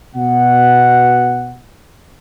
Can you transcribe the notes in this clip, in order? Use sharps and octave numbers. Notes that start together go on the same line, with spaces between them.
B2 F#5